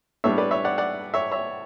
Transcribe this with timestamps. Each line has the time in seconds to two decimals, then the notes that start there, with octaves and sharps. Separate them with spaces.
0.24 A2 G3 B3 D4 C#5 E5
0.38 B4 D5
0.51 C#5 E5
0.64 D5 F#5
0.78 D5 F#5
1.14 C#5 E5
1.32 C#5 E5